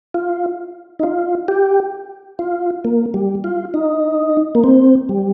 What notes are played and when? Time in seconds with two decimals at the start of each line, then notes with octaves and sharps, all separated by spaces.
0.14 F4
0.99 D#4
1.03 F4
1.48 G4
2.39 F4
2.85 A#3
3.14 G3
3.44 F4
3.74 D#4
4.55 A#3
4.64 C4
5.09 G3